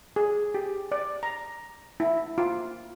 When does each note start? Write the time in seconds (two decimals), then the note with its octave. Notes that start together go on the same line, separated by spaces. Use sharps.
0.16 G#4
0.55 G4
0.92 D5
1.23 A#5
2.00 E4
2.38 F4